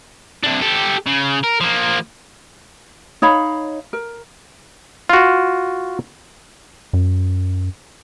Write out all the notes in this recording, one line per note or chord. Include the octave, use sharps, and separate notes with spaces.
C3 D4
G4 A4
C#3
A#4
F3 A#3
D#4 C#5 F5 B5
A#4
F4 F#4
F#2